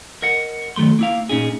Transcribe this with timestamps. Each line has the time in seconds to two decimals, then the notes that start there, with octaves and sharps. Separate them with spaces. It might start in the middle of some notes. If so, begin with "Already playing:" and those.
0.22 A#4 D#5 F#5
0.76 D#3 F#3 A3 C6
0.99 A#3 E4 F5
1.29 A#2 C#4 D#4 G#4